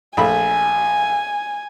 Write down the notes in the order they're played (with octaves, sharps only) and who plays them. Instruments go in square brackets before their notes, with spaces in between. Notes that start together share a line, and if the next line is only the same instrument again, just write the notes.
[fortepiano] A#1 A3 B5 [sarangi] G#5